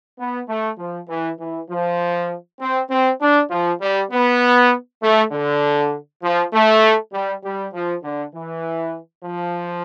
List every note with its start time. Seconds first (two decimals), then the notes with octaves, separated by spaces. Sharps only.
0.19 B3
0.49 A3
0.78 F3
1.09 E3
1.39 E3
1.70 F3
2.60 C4
2.90 C4
3.21 D4
3.51 F3
3.81 G3
4.12 B3
5.02 A3
5.32 D3
6.23 F3
6.53 A3
7.13 G3
7.44 G3
7.74 F3
8.03 D3
8.34 E3
9.24 F3